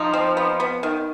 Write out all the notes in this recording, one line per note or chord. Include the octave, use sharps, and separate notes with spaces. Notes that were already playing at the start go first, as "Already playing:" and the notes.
Already playing: F3 D#4
C4
B3
B3
D#3